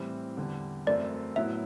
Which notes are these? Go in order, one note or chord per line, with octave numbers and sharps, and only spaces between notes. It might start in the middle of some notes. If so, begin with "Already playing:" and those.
Already playing: A2 E3 G3 C4 E4
E2 D3 G3
F#2 E3 A3 C4 E4 D5
A2 F#3 B3 E4 E5